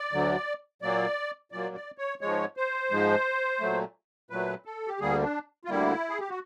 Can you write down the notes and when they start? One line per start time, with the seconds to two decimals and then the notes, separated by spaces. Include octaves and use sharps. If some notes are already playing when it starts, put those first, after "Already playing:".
Already playing: D5
0.12 D2 D3 F#3
0.82 A#2 F#3 A#3 D5
1.52 A#2 F#3 A#3 D5
1.75 D5
1.98 C#5
2.21 G#2 F3 G#3 C#5
2.57 C5
2.90 G#2 F3 G#3
3.60 A#2 F#3 A3
4.30 A#2 F#3 A3 B4
4.65 A4
4.88 G4
5.00 D2 D3 G3 A#3 G#4
5.23 D4
5.65 F4
5.69 D2 D3 G3 A#3 E4
6.10 G#4
6.20 G4
6.29 F#4